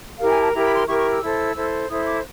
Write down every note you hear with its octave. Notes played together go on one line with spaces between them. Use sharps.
E4 G4 A#4 F5
G#5
A5
E4 G4 A#4 A#5
B5
C6
E4 G4 A#4 C#6
C#6
E6
E4 A4 C5
E4 A4 C5
E4 A4 C5 D#6
D6